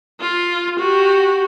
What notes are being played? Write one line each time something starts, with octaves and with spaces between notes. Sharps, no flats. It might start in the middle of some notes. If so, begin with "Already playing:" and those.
F4
F#4 G4